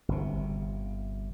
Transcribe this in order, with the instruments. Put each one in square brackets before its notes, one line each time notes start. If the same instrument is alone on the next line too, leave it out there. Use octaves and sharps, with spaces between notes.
[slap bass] G1 C3